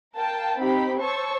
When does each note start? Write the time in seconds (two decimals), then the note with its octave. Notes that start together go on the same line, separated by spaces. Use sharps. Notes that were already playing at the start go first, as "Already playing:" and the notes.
0.18 A#4 F5 G5 A5
0.59 C4 D#4 G4 B5 B6
1.01 C5 C#5 A5 C#6 E6